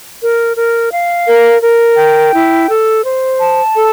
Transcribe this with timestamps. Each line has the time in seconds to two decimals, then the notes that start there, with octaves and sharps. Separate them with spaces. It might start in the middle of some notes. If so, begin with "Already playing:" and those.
0.22 A#4
0.56 A#4
0.92 F5
1.28 A#4
1.62 A#4
1.98 G5
2.34 E4
2.69 A4
3.04 C5
3.40 A5
3.74 A4